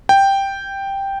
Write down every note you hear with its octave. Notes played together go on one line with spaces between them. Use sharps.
G5